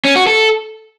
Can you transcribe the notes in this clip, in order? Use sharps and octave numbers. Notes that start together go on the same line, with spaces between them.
C#4
F#4
A4